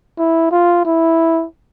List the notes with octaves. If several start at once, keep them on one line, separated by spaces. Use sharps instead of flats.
E4
F4
E4